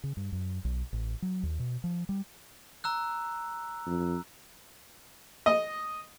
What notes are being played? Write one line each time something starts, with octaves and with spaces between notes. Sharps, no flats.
C#3
G2
F#2
B1
A1
F#3
D#2
B2
F3
G3
A#5 E6 F#6
F2
D#5